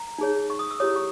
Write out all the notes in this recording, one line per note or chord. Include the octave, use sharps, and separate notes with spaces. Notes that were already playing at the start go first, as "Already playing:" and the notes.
Already playing: A#5
D#4 G#4 C#5
C#6
D#6
E6
E4 G4 C#5 D#6
C#6